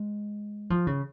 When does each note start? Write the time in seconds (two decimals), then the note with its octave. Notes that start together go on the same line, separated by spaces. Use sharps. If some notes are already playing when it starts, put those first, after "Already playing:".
Already playing: G#3
0.70 F3
0.87 C#3